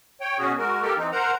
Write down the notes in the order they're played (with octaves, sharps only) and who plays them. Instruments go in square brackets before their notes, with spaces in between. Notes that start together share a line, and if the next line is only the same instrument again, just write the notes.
[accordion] C#5 G5
B2 C#4 F#4 G#4
G#3 F#4 A#4
A#3 G4 A4 A#4
E3 C4 D#4
A#4 C5 F#5 A#5